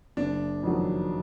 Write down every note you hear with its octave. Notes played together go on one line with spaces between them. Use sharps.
F#1 D4
F2 D#3 F#3